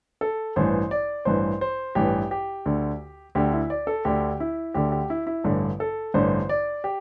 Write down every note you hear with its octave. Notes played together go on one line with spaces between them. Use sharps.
A4
A1 G2 E3 C5
D5
A1 G2 E3 C5
C5
A1 G2 E3 G4
G4
D2 D3
D2 D3 G4
E4
D5
A4
D2 D3 G4
E4
D2 D3 G4
G4
E4
E4
A1 G2 D3
A4
A1 G2 D3 C5
D5
G4